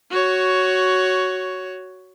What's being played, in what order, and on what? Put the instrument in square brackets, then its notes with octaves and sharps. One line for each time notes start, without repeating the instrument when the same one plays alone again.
[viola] F#4 C#5